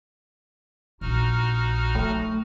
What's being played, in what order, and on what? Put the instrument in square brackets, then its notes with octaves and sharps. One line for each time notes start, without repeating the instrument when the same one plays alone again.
[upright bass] A#1 [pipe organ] D#4 F#4 F6
[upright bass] F#3 [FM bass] A3